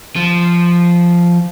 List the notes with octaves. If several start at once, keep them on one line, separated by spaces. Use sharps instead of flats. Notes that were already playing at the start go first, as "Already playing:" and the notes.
F3